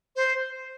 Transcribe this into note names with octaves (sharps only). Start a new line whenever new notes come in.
C5